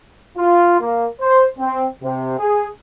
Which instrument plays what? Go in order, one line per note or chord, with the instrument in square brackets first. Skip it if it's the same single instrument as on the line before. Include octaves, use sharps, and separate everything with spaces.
[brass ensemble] F4
A#3
C5
C4
C3
G#4